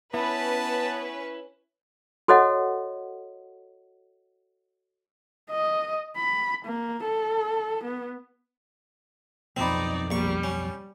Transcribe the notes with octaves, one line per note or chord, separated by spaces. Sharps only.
B3 C#4 E4 B4 A5
F#4 A4 C#5 D#5 F#5
D#5
B5
A#3
A4
B3
B1 F2 C4 D#4 D5 B5
A#1 G3 C#6
C#4